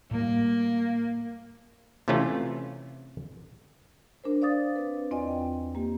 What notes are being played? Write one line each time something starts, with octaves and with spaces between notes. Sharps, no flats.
A2 G3 A#3
C3 E3 A3 C#4 F4
D4 A#4 C5
D5 F5 D6 D#6 A6
C4 B4
E2 C4 F4 D5 D#5 G#5
G5
A#3 G4